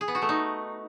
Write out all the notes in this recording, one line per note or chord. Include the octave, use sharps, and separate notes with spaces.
G#4
B3
F#4
A3
D#4